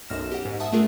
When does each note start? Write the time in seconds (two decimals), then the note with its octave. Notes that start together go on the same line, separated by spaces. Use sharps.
0.09 B1 F#2 F6 A#6 E7
0.32 G4 F#5
0.45 G#2
0.60 E5 F#5 A5 D#6
0.72 A3 D4 F4 G#4 A#4